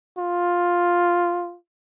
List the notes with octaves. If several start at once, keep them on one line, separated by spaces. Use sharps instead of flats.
F4